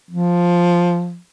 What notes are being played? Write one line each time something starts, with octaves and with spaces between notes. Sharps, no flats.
F3